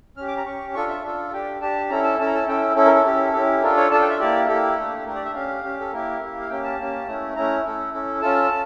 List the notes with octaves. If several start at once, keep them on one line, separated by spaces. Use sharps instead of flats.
C#4 G4 F6
D6
A#5
C#4 G4 C#6
D4 F4 A4 C#6
E5
D4 F4 A4
D4 G4 G5
D4 G4 A5
C#4 E4 A4 A#5
A5
C#4 E4 A4 A5
A#5
A5
C#4 E4 A4 G5
C#4 E4 A4
A#4
A4
C#4 E4 G4
C#4 E4 G4
D4 F4 A4 A#4
C#5
D4 F4 A4 A5
G5
E5
A#3 E4 G4 D5
A#3 E4 G4 A4
A3 D4 G4
A3 D4 G4 A#4
D5
E5
C#4 G4 F5
C#4 G4
A4
A#3 E4 G4 A#4
A#3 E4 G4
F5
A#3 C#4 G4 G5
A5
A#3 C#4 G4
A3 C#4 E4
A3 C#4 E4 A#5
C#4 E4 A4
C#4 E4 A4
C#4 F4 A4 A5